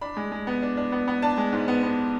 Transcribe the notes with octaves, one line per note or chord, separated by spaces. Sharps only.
D4 B5
G#3
G#3
B3
D4
D4
B3
B3
D4 A5
G#3
G#2
B3
B3